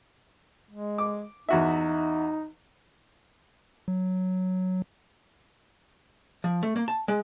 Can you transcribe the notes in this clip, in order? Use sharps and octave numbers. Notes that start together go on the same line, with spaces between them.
G#3
D6
E2 D#4 F#4 E5
F#3
F3
A3
A#3
A5
G#3